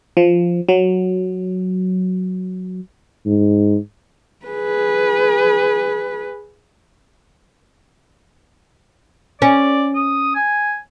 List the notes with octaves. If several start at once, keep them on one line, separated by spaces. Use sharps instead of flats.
F3
F#3
G#2
G#4 B4
C#4 D5
D#6
G#5